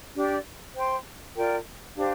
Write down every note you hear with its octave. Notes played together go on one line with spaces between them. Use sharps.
D4 G4 D5
C5 G5 C6
F4 A#4 D5 G5
D4 G4 C5 F5